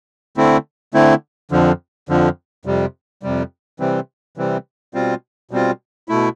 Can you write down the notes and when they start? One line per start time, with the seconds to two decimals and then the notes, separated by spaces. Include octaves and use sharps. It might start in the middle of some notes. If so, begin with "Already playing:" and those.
0.37 D3 A3 C4 E4
0.94 D3 A3 C4 E4
1.51 F2 D3 F3
2.09 F2 D3 F3
2.65 F2 C3 G3
3.23 F2 C3 G3
3.80 C3 E3 G3 C4
4.37 C3 E3 G3 C4
4.94 B2 G3 C4 F4
5.51 B2 G3 C4 F4
6.09 B2 A3 E4